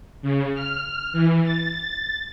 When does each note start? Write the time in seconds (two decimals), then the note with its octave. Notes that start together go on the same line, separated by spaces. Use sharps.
0.22 C#3
0.54 F6
1.12 E3
1.44 A6